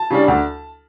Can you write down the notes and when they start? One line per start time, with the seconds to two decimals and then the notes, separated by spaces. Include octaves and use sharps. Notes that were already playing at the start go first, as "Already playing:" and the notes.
Already playing: A5
0.10 C#3 G3 D4
0.28 D2